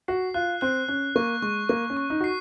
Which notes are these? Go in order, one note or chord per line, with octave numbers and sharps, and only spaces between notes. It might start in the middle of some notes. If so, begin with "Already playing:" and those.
F#4 C7
F4 F#6
C4 F#6
C#4 F#6
A#3 C#6
G#3 C#6
A#3 C#6
C#4
C#6
D#4
F#4 C7